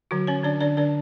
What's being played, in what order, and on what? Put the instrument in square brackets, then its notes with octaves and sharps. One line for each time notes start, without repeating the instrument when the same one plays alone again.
[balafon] D3 F#3 F#4
C#4 C#5
D3 D4 D5
D3 D4 D5
D3 D4 D5